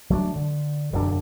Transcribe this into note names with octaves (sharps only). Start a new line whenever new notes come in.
F#3 A3 C#4 D4
D3
E1 F#2 D3 D4